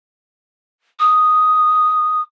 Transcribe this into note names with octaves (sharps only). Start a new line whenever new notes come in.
D#6